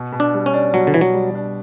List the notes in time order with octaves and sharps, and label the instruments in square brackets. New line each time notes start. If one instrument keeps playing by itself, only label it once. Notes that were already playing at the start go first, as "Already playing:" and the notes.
Already playing: [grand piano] B2
B2
[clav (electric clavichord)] D4
[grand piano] G3
[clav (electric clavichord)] C#4
[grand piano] D4
[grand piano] B2 [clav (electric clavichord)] F#3
[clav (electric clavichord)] D3
[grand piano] B2 [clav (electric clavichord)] E3
[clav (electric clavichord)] F#3
[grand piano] G3
D4